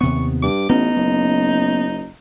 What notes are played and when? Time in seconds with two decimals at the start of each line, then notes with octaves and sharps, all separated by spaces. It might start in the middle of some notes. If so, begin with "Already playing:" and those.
0.01 D#2 C3 B3 C#6
0.43 G2 D6
0.70 A1 B3 C#4 D#4
0.95 F#1